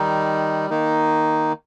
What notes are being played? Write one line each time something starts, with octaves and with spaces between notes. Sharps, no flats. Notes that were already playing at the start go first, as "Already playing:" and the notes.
Already playing: D#3 G3 D#4
D#3 A#3 D#4